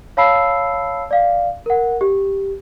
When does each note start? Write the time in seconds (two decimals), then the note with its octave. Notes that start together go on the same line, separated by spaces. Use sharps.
0.17 C#5 F5 A5 B5 E6 C7
1.11 D5 F5
1.66 A#4 F#5
2.01 G4